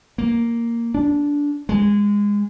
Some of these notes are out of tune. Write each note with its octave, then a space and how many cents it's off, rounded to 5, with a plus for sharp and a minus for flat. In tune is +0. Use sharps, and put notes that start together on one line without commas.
A#3 -5
D4 -15
G#3 -20